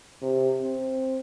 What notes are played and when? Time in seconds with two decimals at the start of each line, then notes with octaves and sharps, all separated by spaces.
0.22 C3
0.62 C4